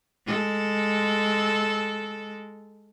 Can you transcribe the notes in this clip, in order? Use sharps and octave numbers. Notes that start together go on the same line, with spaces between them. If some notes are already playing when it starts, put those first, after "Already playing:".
G#3 A4